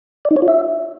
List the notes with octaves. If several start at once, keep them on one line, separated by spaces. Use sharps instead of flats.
D5
D#4
C#5
F4
E5